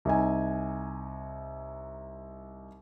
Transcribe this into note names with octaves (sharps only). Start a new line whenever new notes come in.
C2 D#4 G#5